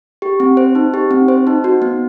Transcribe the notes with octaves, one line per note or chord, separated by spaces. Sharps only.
G4
C4
C5
D#4
G4
C4
C5
D#4
F#4
B3